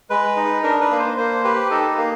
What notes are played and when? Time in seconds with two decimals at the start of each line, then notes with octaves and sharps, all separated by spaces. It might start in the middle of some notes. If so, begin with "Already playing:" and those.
0.10 G#3 B4
0.36 D#4
0.63 D4 A#4
0.81 B4
0.91 A#3
0.99 C5
1.17 A#3 C5
1.44 G4 B4
1.70 D#4 A4
1.97 A#3